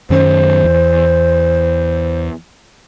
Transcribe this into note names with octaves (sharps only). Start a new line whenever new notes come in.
F#2 D#3 C#4 C5
E2